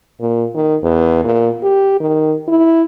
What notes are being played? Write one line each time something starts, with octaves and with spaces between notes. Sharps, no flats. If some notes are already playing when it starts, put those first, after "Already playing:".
A#2
D#3
E2
A#2
G4
D#3
E4